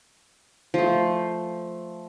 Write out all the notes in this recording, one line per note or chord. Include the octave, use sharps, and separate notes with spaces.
F3 A3